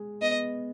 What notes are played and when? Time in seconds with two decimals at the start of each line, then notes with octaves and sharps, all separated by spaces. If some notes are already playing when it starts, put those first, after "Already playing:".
Already playing: G#3 G#4
0.22 B3 D#5